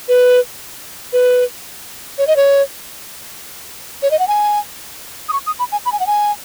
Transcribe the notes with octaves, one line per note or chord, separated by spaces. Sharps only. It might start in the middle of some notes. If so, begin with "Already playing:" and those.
B4
B4
C#5
D#5
C#5
C#5
D#5
F#5
G#5
D#6
C#6
D#6
B5
G#5
B5
G#5
F#5
G#5